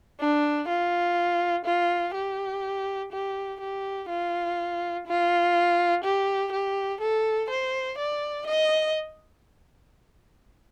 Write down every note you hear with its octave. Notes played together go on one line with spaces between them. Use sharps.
D4
F4
F4
G4
G4
G4
F4
F4
G4
G4
A4
C5
D5
D#5